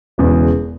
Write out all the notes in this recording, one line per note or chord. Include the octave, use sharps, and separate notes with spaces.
E1 E2 C#3